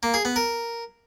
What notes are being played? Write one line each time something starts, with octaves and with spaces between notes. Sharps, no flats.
A#3
G#4
B3
A#4